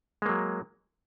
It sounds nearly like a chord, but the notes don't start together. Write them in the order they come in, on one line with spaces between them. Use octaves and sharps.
G#3 A#3 F#3